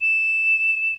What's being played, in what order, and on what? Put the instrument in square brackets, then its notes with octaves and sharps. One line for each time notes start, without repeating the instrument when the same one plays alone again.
[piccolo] E7